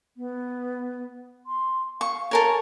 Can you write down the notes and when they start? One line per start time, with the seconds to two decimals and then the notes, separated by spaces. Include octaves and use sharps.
0.17 B3
1.46 C6
2.01 F5 C#6
2.31 A4 A#4 C#5 G#5